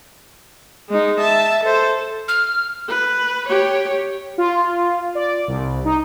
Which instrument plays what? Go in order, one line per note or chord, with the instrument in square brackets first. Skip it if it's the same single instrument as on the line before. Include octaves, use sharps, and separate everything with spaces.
[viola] G#3 D#4
E5 A5
A4 C5
[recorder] F6
[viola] B4
G4 C#5
[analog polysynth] F4
D5
C2
D#4